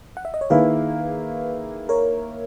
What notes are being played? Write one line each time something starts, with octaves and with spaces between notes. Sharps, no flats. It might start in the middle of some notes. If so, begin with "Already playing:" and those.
F#5
E5
D#5
C#5
D#3 A#3 E4 G#4 B4
A#4 C#5